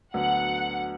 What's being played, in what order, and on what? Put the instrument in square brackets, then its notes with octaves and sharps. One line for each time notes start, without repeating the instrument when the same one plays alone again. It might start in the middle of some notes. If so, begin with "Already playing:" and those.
[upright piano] D2 D3 F#3 B3 [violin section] F#5